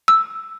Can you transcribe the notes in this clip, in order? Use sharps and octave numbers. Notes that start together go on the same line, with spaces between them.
E6